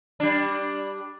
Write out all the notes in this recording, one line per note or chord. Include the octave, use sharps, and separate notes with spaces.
G3 D4